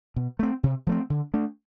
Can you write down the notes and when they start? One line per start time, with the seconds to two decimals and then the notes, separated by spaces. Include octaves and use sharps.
0.16 B2
0.39 A3 C4
0.63 C3
0.87 F3 A3 C4
1.10 D3
1.34 A3 D4